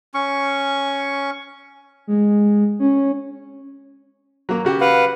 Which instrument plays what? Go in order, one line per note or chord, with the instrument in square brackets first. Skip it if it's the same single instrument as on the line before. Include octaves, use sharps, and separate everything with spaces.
[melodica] C#4 C#6
[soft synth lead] G#3
C#4
[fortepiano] F#3 A#3
C#3 F#4 G4
[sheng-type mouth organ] B4 F5 F#5